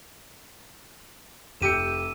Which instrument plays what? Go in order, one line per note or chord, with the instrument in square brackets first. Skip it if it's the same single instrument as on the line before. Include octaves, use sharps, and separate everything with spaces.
[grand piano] F1 G4 C#7 [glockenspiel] E6 D#7 E7